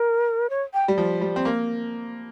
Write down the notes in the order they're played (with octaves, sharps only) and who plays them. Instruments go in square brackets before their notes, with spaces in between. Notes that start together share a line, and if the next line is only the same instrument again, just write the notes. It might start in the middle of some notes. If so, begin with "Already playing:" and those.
Already playing: [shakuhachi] A#4
C#5
G5
[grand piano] G3
F3
G3
C4
A#3